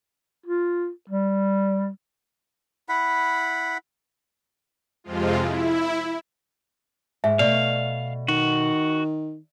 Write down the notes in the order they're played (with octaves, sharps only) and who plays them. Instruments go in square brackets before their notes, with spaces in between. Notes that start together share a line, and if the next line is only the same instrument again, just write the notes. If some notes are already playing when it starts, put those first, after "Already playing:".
[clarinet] F4
G3
[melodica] E4 F#5 B5
[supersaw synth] F2 C3 F3 G#3 F4
E4
[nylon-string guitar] G#2 [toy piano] E5
[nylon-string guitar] B2 A3 [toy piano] D5 [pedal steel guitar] F5
[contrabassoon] D#3 [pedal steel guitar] F#4